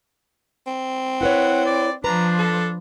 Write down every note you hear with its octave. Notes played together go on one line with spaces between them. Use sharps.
C4
E4 B4 C#5 F#5
D5
F3 D4 B4 A#5
A4